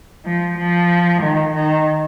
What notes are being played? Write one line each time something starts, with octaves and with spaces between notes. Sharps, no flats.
F3
F3
D#3
D#3